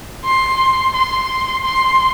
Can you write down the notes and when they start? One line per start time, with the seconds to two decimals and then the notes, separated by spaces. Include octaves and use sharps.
0.25 C6
0.94 C6
1.63 C6